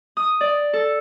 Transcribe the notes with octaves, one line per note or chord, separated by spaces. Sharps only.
D#6
D5
A4